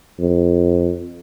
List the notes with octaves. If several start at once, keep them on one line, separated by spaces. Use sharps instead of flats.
F2